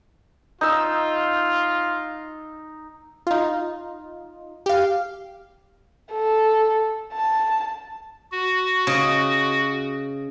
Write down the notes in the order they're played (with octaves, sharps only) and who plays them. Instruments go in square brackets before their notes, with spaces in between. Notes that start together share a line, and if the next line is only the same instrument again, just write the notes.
[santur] D#4 E6 [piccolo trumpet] F4
[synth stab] D#4 F4
G4 F5
[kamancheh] A4
A5
[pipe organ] F#4
[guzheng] C#3 D#5